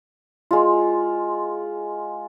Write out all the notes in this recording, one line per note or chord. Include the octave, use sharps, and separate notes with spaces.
G#3 F4